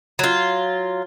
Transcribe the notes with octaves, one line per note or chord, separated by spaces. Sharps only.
F#3 F4